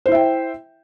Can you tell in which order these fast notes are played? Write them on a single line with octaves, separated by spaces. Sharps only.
C5 E4 E5 G5